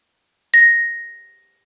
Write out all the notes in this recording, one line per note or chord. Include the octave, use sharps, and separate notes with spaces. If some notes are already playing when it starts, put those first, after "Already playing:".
A#6